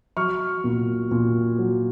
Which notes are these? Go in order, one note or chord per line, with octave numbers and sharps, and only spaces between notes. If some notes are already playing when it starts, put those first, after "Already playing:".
F#3 C#6 F6
A#2
A#2
F#3